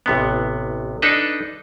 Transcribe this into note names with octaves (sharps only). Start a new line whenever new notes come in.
A1 C3 B3
D4 D#4 A4 B4